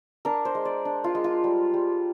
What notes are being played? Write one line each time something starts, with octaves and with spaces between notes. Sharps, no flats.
D4 A#4
C5
G#3
D5
D4
F4
G#3
F4
G3
G3